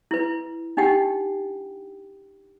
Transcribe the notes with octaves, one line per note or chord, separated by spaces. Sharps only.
E4 B4
D4 D#4 G4 F#5 G5